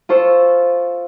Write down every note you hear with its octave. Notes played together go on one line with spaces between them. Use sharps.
F4 A4 C5 C#6 E6